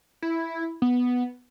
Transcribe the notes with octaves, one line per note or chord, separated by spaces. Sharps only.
E4
B3